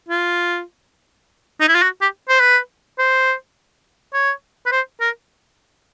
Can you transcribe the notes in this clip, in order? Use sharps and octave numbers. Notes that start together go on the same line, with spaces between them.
F4
D#4
E4
F4
F#4
G4
C5
B4
C5
C#5
B4
C5
A#4